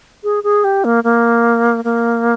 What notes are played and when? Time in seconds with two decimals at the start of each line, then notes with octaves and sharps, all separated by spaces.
0.24 G#4
0.44 G#4
0.64 G4
0.85 A#3
1.04 A#3
1.84 A#3